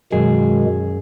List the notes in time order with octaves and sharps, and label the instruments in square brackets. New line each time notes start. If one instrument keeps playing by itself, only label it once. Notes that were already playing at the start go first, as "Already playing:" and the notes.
[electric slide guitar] F#2 G#4 [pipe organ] B2 D#3 G#3